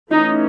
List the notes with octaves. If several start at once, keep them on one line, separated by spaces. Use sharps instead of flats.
E3 A3 C#4 D#4